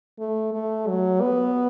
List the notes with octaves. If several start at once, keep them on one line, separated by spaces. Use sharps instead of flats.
A3
A3
F#3
B3